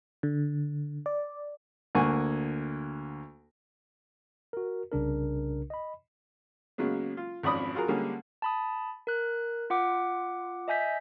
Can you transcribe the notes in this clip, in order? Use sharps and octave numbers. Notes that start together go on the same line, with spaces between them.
D3
D5
D2 A#3 F#5 G#5 C#6
F#4 A#4
C2 C#3 D4 A#4
D#5 B5
C#3 F#3 G#3 A#3 B3
F4
G#1 F2 C#4 D5 B5 D#6
F4 F#4 G#4 A#4
D3 G3 G#3 A#3 C#4 G#4
A5 B5 D#6
A#4 F#6
F4 F#5 D6
D#5 E5 G#5 G6 B6